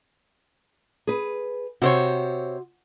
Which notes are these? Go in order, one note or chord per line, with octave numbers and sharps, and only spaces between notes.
G#4 B4
C3 F#4 C5 C#5